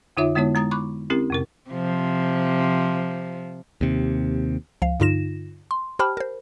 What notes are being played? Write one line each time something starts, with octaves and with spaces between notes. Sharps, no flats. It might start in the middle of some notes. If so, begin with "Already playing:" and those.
F2 D3 D#4 F4 C#5 E5
D3 G#3 B3 E4 C#5
G#3 A#5 D#6 A6
B5 C#6 D6 F#6
C4 C#4 E4 G4 A#4
F2 C3 A#4
C3 F3
D#2 C3
C#2 F3 F5
G2 D3 D#4 F4 A#6 E7
C6
G4 C5 G5 A5 B5 F6
A#4 C5